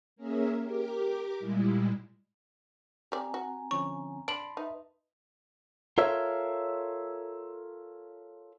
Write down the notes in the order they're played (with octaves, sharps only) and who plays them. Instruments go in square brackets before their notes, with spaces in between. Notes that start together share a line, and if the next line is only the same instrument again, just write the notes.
[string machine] A#3 C#4 G#4 A#4 E5
G4 A#4 D6
A#2 G3 G#3 E4
[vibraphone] C4 G#5 A#5 [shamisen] G4 D5
[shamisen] F#4
[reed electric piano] D3 F3 C#4 [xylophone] C#6
[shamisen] D4 [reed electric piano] A5 B5 C6 [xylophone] D7 F#7
[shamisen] D#4 [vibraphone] B4 D#5 E5
[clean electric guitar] F4 A4 A#4 C#5 E5